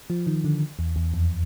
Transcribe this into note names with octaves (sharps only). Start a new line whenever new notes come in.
F3
D#3
D3
E2
E2
F2